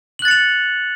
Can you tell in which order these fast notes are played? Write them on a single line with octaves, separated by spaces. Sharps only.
F#7 F#6 A6 C#7 F7